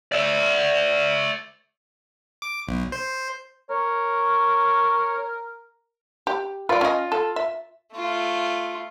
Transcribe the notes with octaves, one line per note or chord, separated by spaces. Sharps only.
D5 E5
D6
B1
C5
A#4 C#5
G4
F4 B4 D5
C#4 D#5
A4
E5
A3 F4